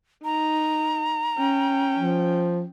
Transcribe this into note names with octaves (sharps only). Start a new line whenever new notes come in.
D#4 A#5
C#4 G5
F3